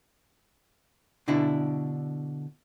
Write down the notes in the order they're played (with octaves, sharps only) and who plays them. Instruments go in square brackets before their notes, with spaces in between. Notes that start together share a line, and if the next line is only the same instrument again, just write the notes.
[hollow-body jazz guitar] B2 D3 D4 E4